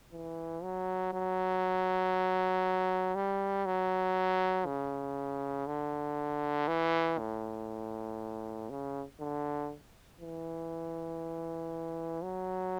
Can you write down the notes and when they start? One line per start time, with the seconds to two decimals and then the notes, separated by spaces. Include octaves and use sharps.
0.13 E3
0.63 F#3
1.13 F#3
3.15 G3
3.66 F#3
4.66 C#3
5.67 D3
6.68 E3
7.19 A2
8.70 C#3
9.20 D3
10.21 E3
12.23 F#3